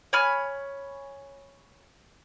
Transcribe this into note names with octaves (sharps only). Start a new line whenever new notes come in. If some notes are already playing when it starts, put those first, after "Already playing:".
C#5 G#5 B5 F6